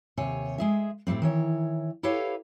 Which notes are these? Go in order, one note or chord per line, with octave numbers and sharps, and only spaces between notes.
D#2 C3 C#5 G#5
G#3 G#4 E5
D2 A2 G3 A#3 C4
D#3 E3 C#5
E4 G4 A4 B4 C#5 F5